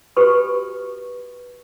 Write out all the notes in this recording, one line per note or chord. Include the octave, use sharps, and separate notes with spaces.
F#4 G4 A4 B4 C#6